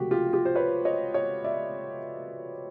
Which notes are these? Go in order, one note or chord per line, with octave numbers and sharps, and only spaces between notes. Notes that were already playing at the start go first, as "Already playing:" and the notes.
Already playing: C#2 C3 F3 A3 F#4 G4
F4 G4
F4 G4
C5
B4 C#5
C#5 D#5
C#5 D#5
D5 E5